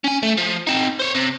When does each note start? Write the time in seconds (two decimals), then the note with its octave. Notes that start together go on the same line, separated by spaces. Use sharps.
0.04 C#4 G#5
0.23 A3
0.37 F3
0.67 C4 D#4
1.00 C5 C#5
1.15 C3